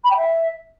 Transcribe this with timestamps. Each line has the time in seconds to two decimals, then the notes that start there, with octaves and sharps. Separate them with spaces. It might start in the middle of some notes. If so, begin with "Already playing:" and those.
0.04 B5
0.10 G5
0.16 E5